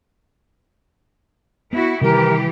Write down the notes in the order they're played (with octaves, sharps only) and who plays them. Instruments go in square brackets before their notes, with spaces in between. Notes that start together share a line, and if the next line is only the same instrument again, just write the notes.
[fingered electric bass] B3 [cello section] E4 F#4
[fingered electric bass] C3 D#3 G3 [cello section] E3 G4 [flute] A#4